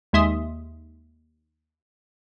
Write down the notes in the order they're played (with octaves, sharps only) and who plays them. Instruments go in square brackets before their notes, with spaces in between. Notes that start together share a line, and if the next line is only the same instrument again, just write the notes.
[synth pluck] D#2 G#3 E5 C6 D#6